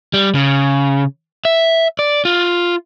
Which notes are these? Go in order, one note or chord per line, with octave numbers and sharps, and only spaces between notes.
G3
C#3
E5
D5
F4